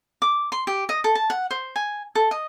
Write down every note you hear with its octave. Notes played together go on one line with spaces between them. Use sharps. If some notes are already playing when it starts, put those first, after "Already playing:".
D6
C6
G4
D#5
A4
A5
F#5
C5
G#5
A4
D#5